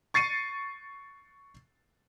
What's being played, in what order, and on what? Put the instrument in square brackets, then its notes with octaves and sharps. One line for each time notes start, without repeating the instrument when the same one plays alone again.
[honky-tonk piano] C#6 A6 C7 C#7 D#7